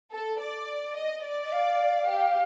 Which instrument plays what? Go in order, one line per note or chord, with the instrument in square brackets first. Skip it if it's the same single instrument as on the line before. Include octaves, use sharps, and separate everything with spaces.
[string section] A4
D5
D#5
D5
[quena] D#5
F5
[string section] G4